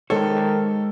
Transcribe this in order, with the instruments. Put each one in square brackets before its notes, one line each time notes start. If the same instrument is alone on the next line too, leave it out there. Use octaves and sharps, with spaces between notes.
[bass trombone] D#3 [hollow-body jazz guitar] G#3 C5 C#5 [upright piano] A4